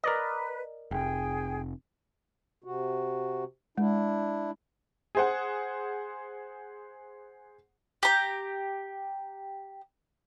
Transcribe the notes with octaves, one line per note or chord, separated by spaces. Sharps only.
A#4 B4 D5 D#5
F1 G#4 G5
C3 F#4
G#3 D4 E4
G#4 C5 F#5
G4 A#5